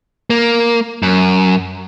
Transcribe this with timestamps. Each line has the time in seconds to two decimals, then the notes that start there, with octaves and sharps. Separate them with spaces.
0.30 A#3
1.02 F#2